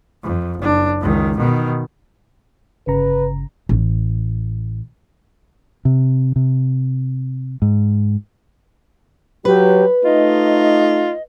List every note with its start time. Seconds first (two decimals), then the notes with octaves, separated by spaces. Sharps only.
0.24 F2
0.59 F#1 D4
1.01 C#2 D#3
1.37 B2 D#3
2.87 G1 C#3 B4 A#5
3.69 A1
5.85 C3
6.36 C3
7.62 G#2
9.45 F#3 G4 B4
10.04 A3 D#4 F4 D#5